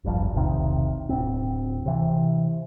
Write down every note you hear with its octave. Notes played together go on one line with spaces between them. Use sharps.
D#1 G#1 G2 F3
E1 B1 C3 D#3
D1 C4
C3 E3